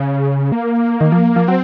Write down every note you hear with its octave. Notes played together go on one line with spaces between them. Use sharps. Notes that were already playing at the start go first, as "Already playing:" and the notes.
Already playing: C#3
A#3
D#3
F3
F3
F#3 C4